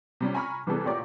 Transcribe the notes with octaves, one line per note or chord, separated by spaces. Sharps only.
C3 G3 C#4
G#5 A#5 B5 C#6 F6
C3 E3 G3 B3 G#4 A4
A1 A#2 G4 C#5 D5 A#5